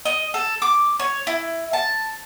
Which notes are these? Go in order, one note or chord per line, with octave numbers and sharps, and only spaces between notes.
D#5
A4
D6
C#5
E4
A5